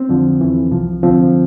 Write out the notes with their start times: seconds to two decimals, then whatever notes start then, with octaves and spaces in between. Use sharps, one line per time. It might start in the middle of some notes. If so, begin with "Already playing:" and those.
Already playing: C4
0.09 F2 D3 F3
0.41 F2 E3
0.71 C2 C3 F3
1.03 D2 D3 F3 C4